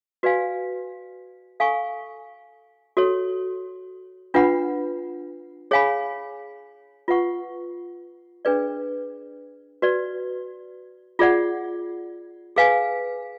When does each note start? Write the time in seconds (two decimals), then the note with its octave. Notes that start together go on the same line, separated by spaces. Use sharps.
0.23 F#4 B4 D5 F5 G#5
1.60 A4 F5 G#5 C#6
2.97 F#4 A4 C#5
4.34 D4 F4 B4 F#5 B5
5.71 G#4 C#5 F5 G#5 B5
7.08 F4 B4 F#5 C#6
8.45 D4 G#4 B4 D5
9.82 F#4 B4 D5
11.19 F4 G#4 D5 F#5
12.56 G#4 B4 F5 G#5